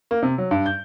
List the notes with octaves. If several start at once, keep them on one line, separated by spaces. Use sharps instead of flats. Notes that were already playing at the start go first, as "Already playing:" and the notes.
A#3
C3
F#3
G2
G6